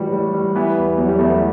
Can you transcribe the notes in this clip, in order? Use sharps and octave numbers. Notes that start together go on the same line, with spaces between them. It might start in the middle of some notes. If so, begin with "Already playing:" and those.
Already playing: A2 E3 G3 F#4
G3
G3
E3 B3
E2
E2 F#3
G3
E2 A3
B3